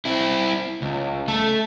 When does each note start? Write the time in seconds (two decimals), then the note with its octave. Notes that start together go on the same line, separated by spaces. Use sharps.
0.05 C4 E4
0.82 C#2
1.28 A3 A4